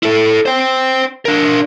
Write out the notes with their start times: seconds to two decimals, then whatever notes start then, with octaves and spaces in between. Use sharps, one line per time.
0.03 E4 A4
0.46 C5 G5
1.25 D4 A#4